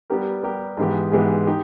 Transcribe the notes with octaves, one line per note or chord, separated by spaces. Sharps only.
G3 B3 G4 A#4
G3 B3 G4 A#4
G#2 E3 G#3 B3 G4
G#2 E3 G#3 B3 G4
D#4 G4